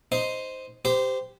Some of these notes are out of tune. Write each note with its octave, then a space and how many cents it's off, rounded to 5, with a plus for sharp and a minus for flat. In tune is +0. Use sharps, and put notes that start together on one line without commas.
D#4 +0 C5 -5
G4 +0 C5 -20